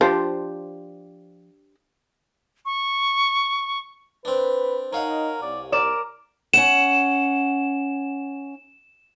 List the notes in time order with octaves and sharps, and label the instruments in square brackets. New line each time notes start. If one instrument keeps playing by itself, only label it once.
[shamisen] F3 [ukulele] D4 G4 C5
[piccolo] C#6
[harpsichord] C4 D4 [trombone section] B4
[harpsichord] C#4 F5 F#5 [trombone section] D#4 [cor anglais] A#4
[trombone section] C2 [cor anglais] D5
[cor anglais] A#4 [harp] D5 D6 E7
[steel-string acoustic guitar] C#4 F#5 [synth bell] E7